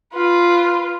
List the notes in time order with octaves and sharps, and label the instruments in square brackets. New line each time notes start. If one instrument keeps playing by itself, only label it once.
[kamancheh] F4 B4